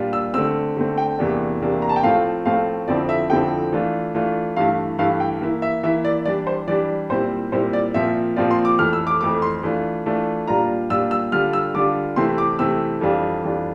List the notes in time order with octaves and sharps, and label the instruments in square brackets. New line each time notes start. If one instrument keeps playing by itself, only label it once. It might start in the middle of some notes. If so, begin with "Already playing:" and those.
Already playing: [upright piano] A#2 G3 D4 F4
E6
D3 A3 C4 E6
D3 A3 C4
G5
E2 C3 E3 A#3 D4
E2 C3 E3 A#3 D4
A#5
A5
G5
A2 F3 A3 C4 F4 F5
A2 F3 A3 C4 F4 F5
F2 D3 F3 C4 E4 D5
E5
F2 D3 F3 C4 E4 G5
E3 A3 D4 F4
E3 A3 D4 F4
G2 E3 A3 E4 F5
G2 E3 A3 E4 F5
G5
E3 A#3 E4
E5
E3 A#3 E4 E5
D5
E3 G3 D4 D5
C5
E3 G3 D4 D5
A#2 G3 C4 E4 C5
A#2 G3 C4 E4 C5
D5
A#2 F3 C4 F4 E5
A#2 F3 C4 F4 D5
C6
D6
F2 E3 A3 F6
E6
D6
F2 E3 A3 D6
C6
E3 A3 D4 F4
E3 A3 D4 F4
A#2 G3 D4 F4 A#5
A#2 G3 D4 F4 E6
E6
D3 G3 D4 F4 F6
E6
D3 G3 D4 F4 D6
C3 E3 A3 C4 E4 C6
D6
C3 E3 A3 C4 E4 E6
F2 E3 G3 D4 F4
F2 E3 G3 D4 F4